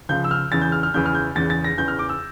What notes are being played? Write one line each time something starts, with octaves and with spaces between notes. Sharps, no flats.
C#2 C#3 F3 G6
E6
F6
E2 C#3 E3 A6
G6
F6
F6
E2 C#3 E3 G6
F6
G6
E2 C#3 E3 A6
A6
A#6
E2 C#3 E3 G6
F6
D6
E6